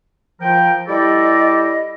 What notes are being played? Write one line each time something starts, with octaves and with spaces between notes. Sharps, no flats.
F3 A#4 G5
G3 E4 G4 A4 D5 D#5